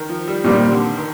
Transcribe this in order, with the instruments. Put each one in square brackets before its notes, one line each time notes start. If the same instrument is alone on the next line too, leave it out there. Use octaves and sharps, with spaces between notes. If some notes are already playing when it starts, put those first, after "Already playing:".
Already playing: [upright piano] D#3
F3
G3
[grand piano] A#2 G3 C4 [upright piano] D#3
[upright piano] D3
D#3